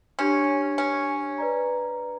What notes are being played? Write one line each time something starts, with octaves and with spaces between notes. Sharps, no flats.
C#4 D4 G4 C#5
C#4
B4 D5 A#5